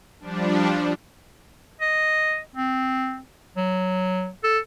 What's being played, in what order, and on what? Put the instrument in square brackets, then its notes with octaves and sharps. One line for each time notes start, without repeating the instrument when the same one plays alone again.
[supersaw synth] F3 G3 D4
[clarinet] D#5
C4
F#3
A4